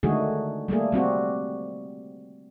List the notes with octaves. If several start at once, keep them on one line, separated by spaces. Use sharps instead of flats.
D3 D#3 G#3 A3 F#4 G#4
G3 A3 A#3 G#4
G3 C4 F#4 G4